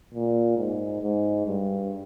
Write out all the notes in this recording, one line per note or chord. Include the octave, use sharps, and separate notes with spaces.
A#2
G#2
G#2
G2